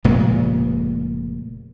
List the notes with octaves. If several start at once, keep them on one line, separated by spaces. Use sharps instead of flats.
F1 A#2 C#3 G#3